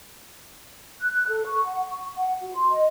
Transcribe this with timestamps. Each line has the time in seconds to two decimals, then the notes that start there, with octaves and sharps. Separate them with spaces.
1.01 F#6
1.27 A4
1.46 C#6
1.65 F#5
1.90 C#6
2.16 F#5
2.41 F#4
2.55 C6
2.71 D#5